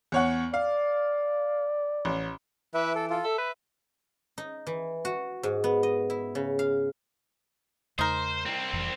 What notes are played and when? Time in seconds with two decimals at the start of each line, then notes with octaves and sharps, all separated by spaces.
0.12 E2 C#5 F#5
0.54 D5 F5
2.05 A1
2.74 E3 B4 E5
2.95 A4
3.10 F4 A4
3.24 A4 E5
3.38 B4
4.38 D#4
4.67 E3
5.05 F#4
5.43 G#2
5.64 B3
5.83 D#5
6.10 E4
6.35 C#3
6.59 F5
7.99 E2 C#3 G#3 D#4 A#4 C5
8.46 C2 C4
8.73 F1 F2 E3